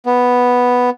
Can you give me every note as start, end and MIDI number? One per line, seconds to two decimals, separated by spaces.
0.06 0.90 59